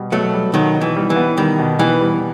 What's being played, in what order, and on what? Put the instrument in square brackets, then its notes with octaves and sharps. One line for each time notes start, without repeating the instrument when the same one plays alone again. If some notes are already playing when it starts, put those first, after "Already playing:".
Already playing: [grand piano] B2 G3
[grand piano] B2 [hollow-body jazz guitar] F#3 A3
[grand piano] G3
[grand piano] B2 [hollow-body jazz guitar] D#3 F#3
[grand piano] B2
[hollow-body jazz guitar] E3
[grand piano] G3
[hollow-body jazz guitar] E3
[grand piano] B3
[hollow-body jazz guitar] D#3 [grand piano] G3
[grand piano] B2
[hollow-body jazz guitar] E3 [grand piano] B3
[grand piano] G3